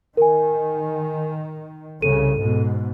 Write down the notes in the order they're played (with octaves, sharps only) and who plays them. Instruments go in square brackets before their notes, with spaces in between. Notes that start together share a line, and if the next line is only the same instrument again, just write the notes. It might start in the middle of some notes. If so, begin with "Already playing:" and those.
[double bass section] D#3 [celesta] A#4 G#5
[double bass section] C2 C#3 [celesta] A4 D#7
[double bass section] G#2 B2